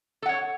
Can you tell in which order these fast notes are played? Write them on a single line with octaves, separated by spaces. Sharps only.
A4 F#5 C#5